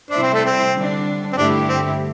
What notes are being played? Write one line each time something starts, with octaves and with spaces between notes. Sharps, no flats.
C3 G3 D4 E4 C5
C4
A3
C4
D3 G3 D4
C4
G2 D3 A3 D4 E4 G4
C4